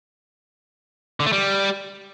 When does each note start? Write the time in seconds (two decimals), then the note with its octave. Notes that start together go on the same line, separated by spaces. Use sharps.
1.20 D3
1.26 A3
1.32 G3